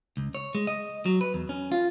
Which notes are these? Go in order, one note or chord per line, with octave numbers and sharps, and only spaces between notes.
C#2
C#5
G#3
D#5
F#3
B4
E2
C#4
F4